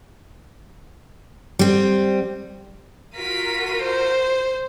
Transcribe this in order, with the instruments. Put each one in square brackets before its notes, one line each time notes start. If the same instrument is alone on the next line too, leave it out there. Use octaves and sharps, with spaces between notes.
[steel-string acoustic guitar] G3 C4
[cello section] F4 F#4 A#4 [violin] B6 D#7
[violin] C5